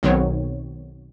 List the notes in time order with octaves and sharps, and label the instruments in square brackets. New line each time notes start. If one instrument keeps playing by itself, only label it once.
[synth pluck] B1 B2 D#3 F#3 C4 C#5